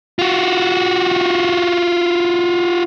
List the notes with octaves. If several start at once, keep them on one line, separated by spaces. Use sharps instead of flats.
F4 F#4